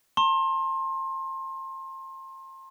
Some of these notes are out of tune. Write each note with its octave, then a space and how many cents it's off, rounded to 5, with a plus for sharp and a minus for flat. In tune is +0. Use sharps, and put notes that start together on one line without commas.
A5 +45 C6 +30